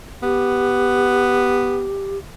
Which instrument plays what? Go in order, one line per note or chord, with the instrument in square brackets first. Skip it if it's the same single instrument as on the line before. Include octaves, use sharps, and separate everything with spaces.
[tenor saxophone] B3 [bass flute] G4